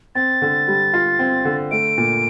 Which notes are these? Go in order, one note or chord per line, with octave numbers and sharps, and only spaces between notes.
C4 A6
D3
G3
F4
C4
D3
A3 D7
A#2